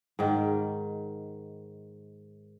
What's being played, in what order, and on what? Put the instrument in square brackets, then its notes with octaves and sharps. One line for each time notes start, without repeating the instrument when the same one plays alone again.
[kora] G#2 D#3